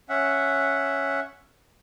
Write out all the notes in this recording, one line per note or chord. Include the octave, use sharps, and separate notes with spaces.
C#4 E5 F#5